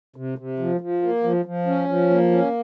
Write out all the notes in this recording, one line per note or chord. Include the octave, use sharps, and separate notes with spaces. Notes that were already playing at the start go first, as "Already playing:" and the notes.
C3
C3
F3
F3
A#3
F3
F3
C#4
F3
A#3
C#4